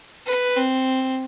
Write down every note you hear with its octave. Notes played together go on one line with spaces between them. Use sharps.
B4
C4